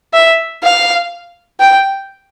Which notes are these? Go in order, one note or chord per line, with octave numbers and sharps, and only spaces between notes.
E5
F5
G5